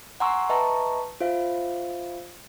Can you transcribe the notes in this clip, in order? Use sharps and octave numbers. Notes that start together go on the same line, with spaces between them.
F#5 G#5 A#5 C6 C#6 E6
B4 D#5 E5 A5 A#5 C#6
F4 C5 E5 F5